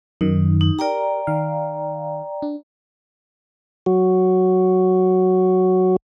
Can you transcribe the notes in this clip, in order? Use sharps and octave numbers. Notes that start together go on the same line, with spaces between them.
F#2 D#3 D#4
D#4
G4 A#4 D5 G5 A#5
D#3 F5
D4
F#3 F#4